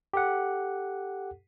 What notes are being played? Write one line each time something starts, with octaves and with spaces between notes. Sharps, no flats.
G4 A4 F#5